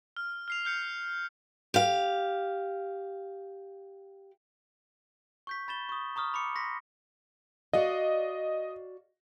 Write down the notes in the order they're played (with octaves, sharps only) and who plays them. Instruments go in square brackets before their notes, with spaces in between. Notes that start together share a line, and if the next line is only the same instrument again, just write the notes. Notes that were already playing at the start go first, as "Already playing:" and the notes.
[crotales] F6
F6 C7 F7
F6 G6 C#7
[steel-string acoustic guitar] G4 F5
[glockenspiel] C#6 G6 B6
B5 A6 E7 G7
C#6 D#6
A#5 C#6 D#6 F6
B5 D6 C#7
C6 A#6 B6
[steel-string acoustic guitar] F#4 D5 F5 [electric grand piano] D#5